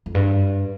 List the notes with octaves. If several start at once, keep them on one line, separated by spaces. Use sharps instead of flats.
F2
G2